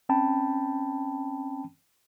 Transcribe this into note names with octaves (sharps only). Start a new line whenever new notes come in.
C4 C#4 G5 A5 B5